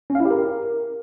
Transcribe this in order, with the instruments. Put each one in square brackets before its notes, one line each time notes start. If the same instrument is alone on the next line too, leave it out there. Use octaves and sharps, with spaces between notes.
[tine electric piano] C#4
F5
E4
G4
A#4